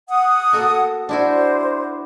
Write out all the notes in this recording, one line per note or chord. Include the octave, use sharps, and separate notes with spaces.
F#5 D#6
A#3 F#4 A4
D4 E4 F#4 C5